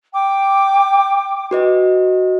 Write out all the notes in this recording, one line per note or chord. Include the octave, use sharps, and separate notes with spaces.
G5 D6
F#4 B4 D#5